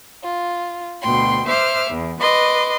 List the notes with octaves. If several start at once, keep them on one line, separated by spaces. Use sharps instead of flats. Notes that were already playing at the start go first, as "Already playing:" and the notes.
F4
D2 B2 G5 C6
C5 E5 D6 F6
E2
B4 D#5 C6 D6